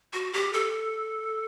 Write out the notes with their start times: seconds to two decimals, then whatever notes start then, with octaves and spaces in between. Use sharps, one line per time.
0.13 F#4
0.33 G4
0.53 A4